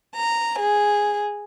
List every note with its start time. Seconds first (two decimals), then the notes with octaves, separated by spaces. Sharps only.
0.16 A#5
0.59 G#4